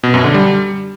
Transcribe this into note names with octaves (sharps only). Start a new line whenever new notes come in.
B2
F#2
D3
G3